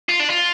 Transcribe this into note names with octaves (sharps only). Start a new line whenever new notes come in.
F4
D4
F4